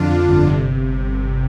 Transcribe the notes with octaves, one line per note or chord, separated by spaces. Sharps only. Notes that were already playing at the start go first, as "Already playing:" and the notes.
Already playing: F2 D3 D4 F4
D3
G1
C3